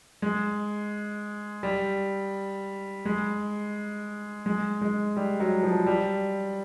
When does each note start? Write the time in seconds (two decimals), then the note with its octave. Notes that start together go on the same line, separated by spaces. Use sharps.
0.22 G#3
1.63 G3
3.05 G#3
4.46 G#3
4.81 G#3
5.17 G3
5.40 F#3
5.63 F3
5.86 G3